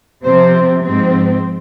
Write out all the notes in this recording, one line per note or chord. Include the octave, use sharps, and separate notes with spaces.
C3 F3 C4 C5
G#2 F3 C4